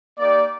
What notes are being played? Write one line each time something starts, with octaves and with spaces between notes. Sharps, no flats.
A#3 D#4 G4 D5